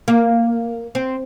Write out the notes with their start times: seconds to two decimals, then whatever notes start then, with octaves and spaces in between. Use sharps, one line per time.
0.08 A#3
0.95 C4